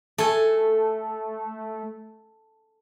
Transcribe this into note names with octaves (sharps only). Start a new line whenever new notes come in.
A3 A4 G#5